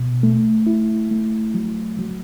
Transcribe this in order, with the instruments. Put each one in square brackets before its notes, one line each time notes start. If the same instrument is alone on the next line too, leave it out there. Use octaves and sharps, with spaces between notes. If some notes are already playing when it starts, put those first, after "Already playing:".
Already playing: [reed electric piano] B2
A3
E4
A3
F#3
F#3